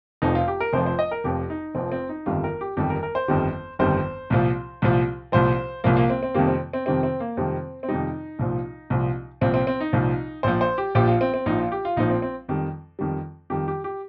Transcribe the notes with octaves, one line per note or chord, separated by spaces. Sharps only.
F1 F2 F3 D#4
F4
G4
A#4
F1 F2 F3 C5
C5
D#5
A#4
F1 F2 F3 G4
D#4
F1 F2 F3 C4
C4
D#4
G1 F2 D#3 G3 F4
A#4
G4
G1 F2 D#3 G3 G4
A#4
A#4
C5
G1 F2 D#3 G3
G1 F2 D#3 G3 C5
C2 A#2 F3
C2 A#2 F3
C2 A#2 F3 C5
C2 A#2 F3 A#3
A#3
C4
C4
F2 C3 D#3 G3 A#3
C4
C4
F2 C3 D#3 G3 C4
C4
A#3
F2 C3 D#3 G3 C4
C4
F2 C3 D#3 G3 D#4
C2 A#2 F3
C2 A#2 F3
C2 A#2 F3 C4
C4
C4
D#4
C2 A#2 F3
A#1 A#2 F3 C5
C5
G4
A#1 A#2 F3 G4
F4
C4
C4
A#1 A#2 F3 D#4
F4
G4
F4
A#1 A#2 F3 D#4
C4
C4
F2 D#3 G3
F2 D#3 G3
F2 D#3 G3 G4
G4
G4